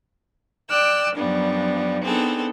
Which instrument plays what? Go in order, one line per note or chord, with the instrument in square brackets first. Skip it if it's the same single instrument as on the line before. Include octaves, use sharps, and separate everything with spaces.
[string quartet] D5 G5 E6 F#6
F#2 F3 G3 B3 D4
B3 C4 D4 D#4 G#4 A4